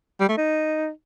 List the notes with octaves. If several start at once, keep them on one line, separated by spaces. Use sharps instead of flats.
G3
A3
D#4